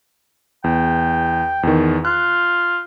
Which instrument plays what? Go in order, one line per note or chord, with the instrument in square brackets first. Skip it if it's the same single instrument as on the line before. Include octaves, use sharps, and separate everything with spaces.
[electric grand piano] E2 [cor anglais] G5
[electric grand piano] E2 D#3
[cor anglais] F4 [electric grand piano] F#6